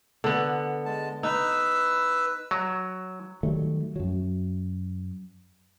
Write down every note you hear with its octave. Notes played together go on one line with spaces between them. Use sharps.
D3 B3
G#3 A5
D#4 B4 E6
F#3
D#3 F#3 G3 A3
F#2 F#3